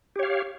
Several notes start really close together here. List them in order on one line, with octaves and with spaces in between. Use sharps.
G4 C#5 F5